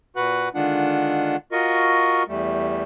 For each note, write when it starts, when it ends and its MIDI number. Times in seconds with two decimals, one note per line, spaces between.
0.16 0.49 46
0.16 0.49 66
0.16 0.49 71
0.16 0.49 78
0.16 0.49 90
0.55 1.36 50
0.55 1.36 51
0.55 1.36 56
0.55 1.36 62
0.55 1.36 65
0.55 1.36 78
1.52 2.23 65
1.52 2.23 66
1.52 2.23 70
1.52 2.23 75
1.52 2.23 85
2.28 2.83 40
2.28 2.83 55
2.28 2.83 57